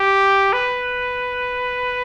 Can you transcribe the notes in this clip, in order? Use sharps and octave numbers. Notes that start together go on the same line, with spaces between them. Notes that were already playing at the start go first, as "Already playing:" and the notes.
Already playing: G4
B4